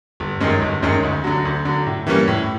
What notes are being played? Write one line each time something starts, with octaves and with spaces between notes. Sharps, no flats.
G1
F#2 D#3 G#3 C#4
G1
F#2 D#3 G#3 C#4
D2
D3 F#3
D2
D3 F#3
A2
E3 G3 A#3 C#4
A2